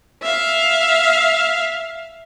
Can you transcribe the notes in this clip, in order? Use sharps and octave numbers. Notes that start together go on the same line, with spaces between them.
E5 F5